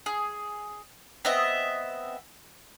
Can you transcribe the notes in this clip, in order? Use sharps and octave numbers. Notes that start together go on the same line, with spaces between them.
G#4
B3 C4 D#5 E5